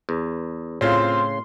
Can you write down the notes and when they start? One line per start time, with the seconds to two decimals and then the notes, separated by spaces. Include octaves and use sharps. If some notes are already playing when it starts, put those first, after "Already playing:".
0.09 E2
0.81 A2 C#3 C4 F4 C6